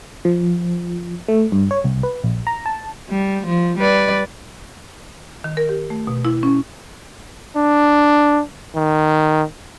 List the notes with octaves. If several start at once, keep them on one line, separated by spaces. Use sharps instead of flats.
F3
A3
G2
C#5
C2
B4
A#1
A#5
A5
G3
F3
G3 B4 D5
D#3
A#4
G4
A3
B2
E4
C#4
D4
D#3